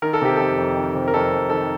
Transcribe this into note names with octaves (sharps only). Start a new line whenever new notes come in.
D#3 A#4
A4
C3 G4
F2 A4
F2
D#3
C3
A#4
F2 A4
F2
D#3 A4